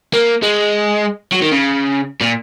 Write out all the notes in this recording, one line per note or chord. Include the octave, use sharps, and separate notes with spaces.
A#3
G#3
F#3
D#3
C#3
A#2